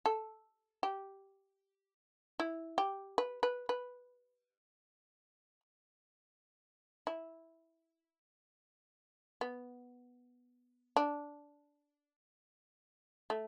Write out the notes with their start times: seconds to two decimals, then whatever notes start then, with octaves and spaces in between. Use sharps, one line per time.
0.06 A4
0.83 G4
2.40 E4
2.78 G4
3.18 B4
3.43 B4
3.69 B4
7.07 E4
9.41 B3
10.96 D4
13.30 A3